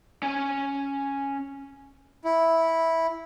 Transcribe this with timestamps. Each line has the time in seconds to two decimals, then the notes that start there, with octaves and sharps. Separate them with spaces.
0.23 C#4 G#5
2.25 E4